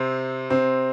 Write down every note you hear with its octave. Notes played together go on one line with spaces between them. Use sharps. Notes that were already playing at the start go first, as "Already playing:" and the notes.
Already playing: C3 C4
C3 C4